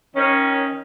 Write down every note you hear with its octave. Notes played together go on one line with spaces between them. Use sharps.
D#3 C#4